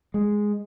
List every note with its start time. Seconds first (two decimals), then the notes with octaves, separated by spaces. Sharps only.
0.14 G#3